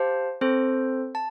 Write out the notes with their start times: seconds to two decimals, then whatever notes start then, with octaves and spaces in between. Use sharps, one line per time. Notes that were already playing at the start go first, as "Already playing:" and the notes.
Already playing: G4 C5 F5 A5
0.41 C4 A4 C5
1.15 A5